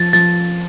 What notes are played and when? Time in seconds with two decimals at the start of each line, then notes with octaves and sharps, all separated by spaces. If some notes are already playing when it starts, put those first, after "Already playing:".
Already playing: F3 A6
0.13 F3 A6